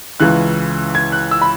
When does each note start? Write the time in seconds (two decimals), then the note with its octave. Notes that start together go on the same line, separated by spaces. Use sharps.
0.20 C#2 C#3 E3 F#6
0.95 G#6
1.12 F#6
1.31 E6
1.42 B5